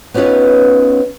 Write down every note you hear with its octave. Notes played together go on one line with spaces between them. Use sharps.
B3 C#4 D#4 F4 B4 C#5